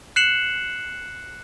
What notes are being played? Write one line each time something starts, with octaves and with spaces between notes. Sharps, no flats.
F#6 C7 C#7 E7 F#7